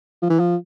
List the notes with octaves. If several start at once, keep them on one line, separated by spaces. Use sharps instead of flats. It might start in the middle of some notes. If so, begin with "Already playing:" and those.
F3
E3
F3